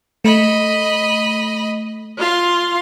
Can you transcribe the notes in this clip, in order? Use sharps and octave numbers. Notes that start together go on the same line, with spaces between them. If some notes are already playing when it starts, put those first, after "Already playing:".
A3 D#5 B5
F4 F5 C6